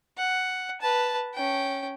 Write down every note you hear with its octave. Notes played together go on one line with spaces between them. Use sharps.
F#5
B4 A5
C#4 G5